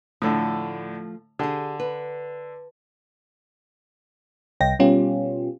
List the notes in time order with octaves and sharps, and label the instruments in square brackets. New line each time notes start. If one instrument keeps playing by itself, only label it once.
[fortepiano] A2 D3 [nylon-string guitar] F3 A3
[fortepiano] D3 [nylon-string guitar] G4 G#4
[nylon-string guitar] B4
[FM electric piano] C2 G5 A#6
B2 G3 B3 C#4 F4 G4